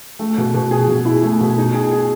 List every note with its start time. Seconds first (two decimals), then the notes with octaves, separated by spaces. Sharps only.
0.19 A3
0.38 B2
0.54 B2
0.71 G#4
0.88 B2
1.05 E4
1.23 A3
1.41 B2
1.58 D#4
1.74 G#4
1.91 G#4